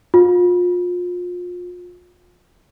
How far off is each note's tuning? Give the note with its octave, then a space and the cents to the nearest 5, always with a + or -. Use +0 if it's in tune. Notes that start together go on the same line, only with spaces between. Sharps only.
F4 +30